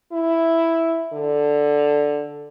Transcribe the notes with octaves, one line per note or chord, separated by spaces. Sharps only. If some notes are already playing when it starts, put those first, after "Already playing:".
E4
D3